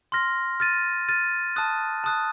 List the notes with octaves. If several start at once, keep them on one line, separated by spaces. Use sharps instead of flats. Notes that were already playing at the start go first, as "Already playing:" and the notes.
C6 F6 A#6
F6 A6 D#7
F6 A6 D#7
A5 D#6 F#6
A5 D#6 F#6